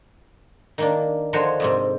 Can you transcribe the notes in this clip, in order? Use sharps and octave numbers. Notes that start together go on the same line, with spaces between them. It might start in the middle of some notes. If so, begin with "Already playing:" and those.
D#3 A#3 D4
D3 D#3 F3 F#4 C5 C#5
F2 G#2 C3